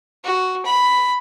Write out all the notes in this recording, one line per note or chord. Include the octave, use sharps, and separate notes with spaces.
F#4
B5